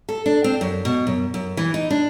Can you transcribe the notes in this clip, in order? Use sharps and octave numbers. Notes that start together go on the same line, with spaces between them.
A4
D4
C4
F#2
B2
F#2
F#2
E3
D#4
D4